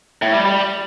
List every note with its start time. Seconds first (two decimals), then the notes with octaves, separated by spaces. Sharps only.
0.22 A2
0.34 G3
0.45 G3